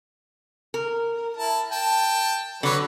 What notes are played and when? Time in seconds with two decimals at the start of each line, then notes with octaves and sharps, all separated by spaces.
0.74 A#4
1.37 E4 A5
1.71 G5 A5
2.63 D3 F#3 B4 C#5